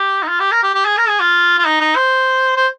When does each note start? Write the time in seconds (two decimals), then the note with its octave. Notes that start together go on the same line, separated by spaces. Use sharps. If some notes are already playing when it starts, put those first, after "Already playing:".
Already playing: G4
0.23 D#4
0.28 F4
0.40 G4
0.52 A#4
0.63 G4
0.75 G4
0.85 G#4
0.98 A#4
1.08 G#4
1.20 F4
1.59 F4
1.66 D#4
1.81 D#4
1.96 C5
2.56 C5